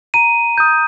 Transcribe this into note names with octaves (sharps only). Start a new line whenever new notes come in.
A#5 D#7
D#6 G6